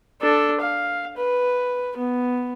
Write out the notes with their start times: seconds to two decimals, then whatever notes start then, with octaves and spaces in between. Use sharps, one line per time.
0.21 D4 A4
0.61 F5
1.17 B4
1.97 B3